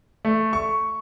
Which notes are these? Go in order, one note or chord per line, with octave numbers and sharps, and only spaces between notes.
A3
C#6